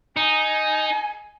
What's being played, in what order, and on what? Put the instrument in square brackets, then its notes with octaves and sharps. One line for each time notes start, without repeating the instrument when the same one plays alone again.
[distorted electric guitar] D#4 [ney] G#5